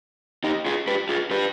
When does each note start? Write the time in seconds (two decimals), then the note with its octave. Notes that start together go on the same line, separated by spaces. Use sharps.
0.44 D#4 G4
0.66 F4 G#4
0.87 G4 B4
1.09 F4 G#4
1.31 G4 B4